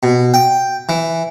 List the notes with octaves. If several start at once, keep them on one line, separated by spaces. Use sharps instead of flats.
B2
G5
E3